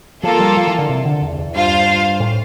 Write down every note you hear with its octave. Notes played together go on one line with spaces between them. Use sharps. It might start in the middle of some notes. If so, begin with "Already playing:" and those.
F3 A#3 F4 A4
G3
F3
E3
D3
C3
D3
E2
E2
G2 F4 C5 F5
A2